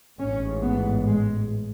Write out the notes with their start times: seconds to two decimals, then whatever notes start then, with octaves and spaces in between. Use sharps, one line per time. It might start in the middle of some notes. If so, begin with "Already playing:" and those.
0.18 A1 G#2 C#4
0.62 B3
1.07 G#3